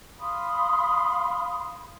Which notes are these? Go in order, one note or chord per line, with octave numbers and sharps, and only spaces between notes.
F5 B5 C6 D#6